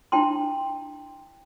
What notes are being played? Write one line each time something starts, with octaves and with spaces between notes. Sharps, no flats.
D4 E4 G5 A5 C6